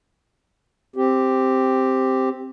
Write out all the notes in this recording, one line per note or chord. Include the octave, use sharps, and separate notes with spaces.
C4 G4